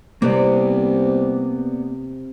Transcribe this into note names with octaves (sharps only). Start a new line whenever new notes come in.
C2 C3 A#3 B3 D5